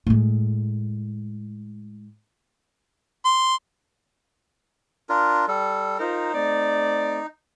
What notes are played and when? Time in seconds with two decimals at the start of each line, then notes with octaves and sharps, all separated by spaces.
0.07 A2 G#3
3.25 C6
5.09 D4 F4 A#4
5.48 G3 A4
5.99 D#4 F4 A#4 C5
6.35 A3 C4 D5